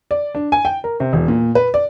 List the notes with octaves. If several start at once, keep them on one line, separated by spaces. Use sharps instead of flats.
D5
D4
G#5
G5
A#4
C3
E1
A#2
B4
D5